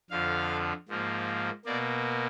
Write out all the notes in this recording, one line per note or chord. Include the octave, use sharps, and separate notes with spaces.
F2 D3 F3 F5
G#2 F3 A#3
B2 A#3 D5